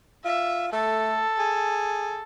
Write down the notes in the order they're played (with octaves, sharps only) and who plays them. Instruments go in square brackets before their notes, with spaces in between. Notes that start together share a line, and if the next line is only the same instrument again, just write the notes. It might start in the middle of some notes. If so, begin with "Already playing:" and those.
[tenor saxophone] F4 [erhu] E5
[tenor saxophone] A3 [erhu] A4
[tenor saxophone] G#4